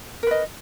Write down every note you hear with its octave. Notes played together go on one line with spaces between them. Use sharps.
A#4 B4 D#5